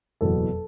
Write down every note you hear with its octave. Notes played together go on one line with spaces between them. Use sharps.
F#1 E2 B2 F#3 A4